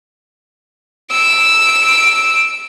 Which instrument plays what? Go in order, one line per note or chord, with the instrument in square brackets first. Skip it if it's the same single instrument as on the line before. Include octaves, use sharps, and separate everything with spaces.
[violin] E6 D7